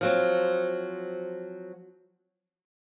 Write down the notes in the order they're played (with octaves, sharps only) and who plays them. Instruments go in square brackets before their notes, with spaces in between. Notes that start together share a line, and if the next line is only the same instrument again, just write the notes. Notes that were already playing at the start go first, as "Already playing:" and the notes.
[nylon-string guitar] F3 F#3 C4